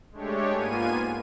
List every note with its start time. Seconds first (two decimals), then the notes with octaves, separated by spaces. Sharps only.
0.12 G#3 A3 D4 G4 C#5
0.54 G#2 A#3 B3 F4 G#5 D#7